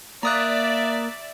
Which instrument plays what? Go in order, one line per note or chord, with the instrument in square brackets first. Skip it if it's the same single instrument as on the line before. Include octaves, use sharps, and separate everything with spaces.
[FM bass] A#3 [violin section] D5 E5 [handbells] A#5 D#6 F#6